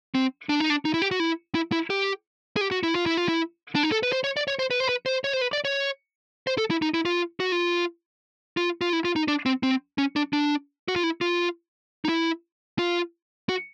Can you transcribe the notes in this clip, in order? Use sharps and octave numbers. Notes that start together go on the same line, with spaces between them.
C4
D4
D#4
D4
D#4
E4
G4
F#4
E4
E4
E4
G4
G#4
G4
F#4
E4
F4
E4
F4
E4
D4
D#4
A4
B4
C5
C#5
D5
C#5
C5
B4
C5
B4
C5
C#5
C5
B4
D5
C#5
C5
A4
E4
D#4
E4
F4
F#4
F4
F4
F4
E4
F4
D#4
D4
C4
C4
C#4
D4
D4
F#4
F4
E4
F4
D#4
E4
F4
F#4